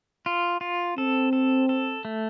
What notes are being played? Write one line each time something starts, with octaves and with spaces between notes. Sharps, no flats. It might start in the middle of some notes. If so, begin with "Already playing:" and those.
F4
F4
C4 A4
A4
A4
A3